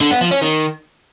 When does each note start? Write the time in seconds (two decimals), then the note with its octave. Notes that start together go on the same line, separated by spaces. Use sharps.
0.01 D3
0.11 B3
0.21 F3
0.31 C#4
0.41 D#3